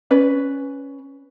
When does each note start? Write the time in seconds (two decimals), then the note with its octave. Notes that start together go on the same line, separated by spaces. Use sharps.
0.11 C#4 B4 D5